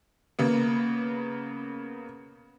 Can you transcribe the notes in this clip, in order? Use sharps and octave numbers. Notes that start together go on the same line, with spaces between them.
C#3 A#3 B3